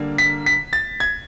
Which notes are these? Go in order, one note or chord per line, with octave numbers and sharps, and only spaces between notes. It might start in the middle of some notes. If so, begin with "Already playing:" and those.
Already playing: D3 G3 A#3
B6
B6
A6
G#6